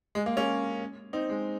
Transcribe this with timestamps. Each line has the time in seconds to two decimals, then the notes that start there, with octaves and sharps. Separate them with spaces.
0.15 G#3
0.26 A#3
0.37 A#3 C#4
1.13 C4 D#4
1.30 G#3